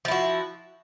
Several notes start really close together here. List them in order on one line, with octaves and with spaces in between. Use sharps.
F3 E4 F#4